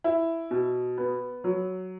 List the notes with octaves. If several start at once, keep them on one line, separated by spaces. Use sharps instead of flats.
E4
B2
B3
F#3